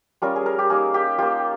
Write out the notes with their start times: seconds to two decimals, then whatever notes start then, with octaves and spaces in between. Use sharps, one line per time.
0.22 G3 C#4 F4 A#4
0.36 G#4
0.46 A#4
0.58 G4
0.70 A#3 D#4 G#4
0.94 G4
1.18 A#3 F4 G4